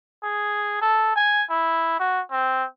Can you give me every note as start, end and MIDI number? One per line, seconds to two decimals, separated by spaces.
0.23 0.81 68
0.82 1.15 69
1.16 1.45 80
1.50 1.97 64
2.00 2.21 66
2.31 2.65 60